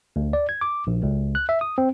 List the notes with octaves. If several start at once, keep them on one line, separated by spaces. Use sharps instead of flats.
D2
D5
G#6
D6
A#1
C#2
F#6
E5
D#6
C4